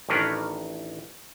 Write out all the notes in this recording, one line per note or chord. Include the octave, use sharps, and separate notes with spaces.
A1 D#3 D4 A#4 B4 C#5